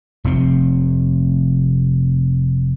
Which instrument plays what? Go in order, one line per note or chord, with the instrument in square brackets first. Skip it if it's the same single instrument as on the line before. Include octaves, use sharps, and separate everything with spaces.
[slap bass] F1 C3 C4